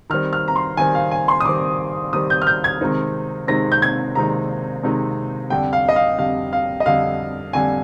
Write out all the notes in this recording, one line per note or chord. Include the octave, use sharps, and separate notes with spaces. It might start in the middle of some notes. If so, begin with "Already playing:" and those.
D#3 G3 C4 F6
F6
A#5
C6
D#3 G3 C4 G#5
F5
G#5
C6
D#6
D#3 G3 C4 D6
D#3 G3 C4 D#6
G6
F6
G6
G#6
C3 D#3 G#3 C4 D#4
C3 D#3 G#3 C4 D#4 A#6
G6
G#6
C3 D#3 G#3 C4 D#4 A#5
C3 D#3 G#3 C4 D#4
F2 D3 G3 G5
F5
D#5
F5
F2 D3 G3 F5
F5
D#5
F2 D3 G3 F5
F2 D3 G3 G#5